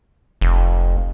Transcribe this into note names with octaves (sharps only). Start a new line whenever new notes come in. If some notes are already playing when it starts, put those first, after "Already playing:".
F1